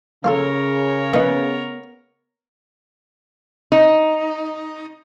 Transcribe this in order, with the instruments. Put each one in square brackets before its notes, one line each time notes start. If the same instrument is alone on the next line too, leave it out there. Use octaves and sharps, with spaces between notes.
[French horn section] C#3 [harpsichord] A#3 F4 A4 [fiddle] A#4 C#5
[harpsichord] A#3 D#4 [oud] B3
[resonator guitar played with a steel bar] D#4